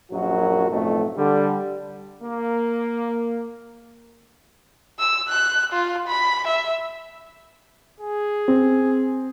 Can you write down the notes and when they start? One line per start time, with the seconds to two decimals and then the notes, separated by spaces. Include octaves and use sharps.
0.12 A#1 F#2 F#3 F#4
0.70 B1 F2 A2 A3
1.18 D3 G3
2.22 A#3
5.00 E6
5.29 F#6
5.73 F4
6.08 B5
6.48 E5
8.00 G#4
8.48 C4